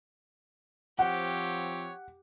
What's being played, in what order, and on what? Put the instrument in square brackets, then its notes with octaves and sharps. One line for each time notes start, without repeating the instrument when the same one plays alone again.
[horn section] F3 C4 C#5 [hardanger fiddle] G4 [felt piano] F#5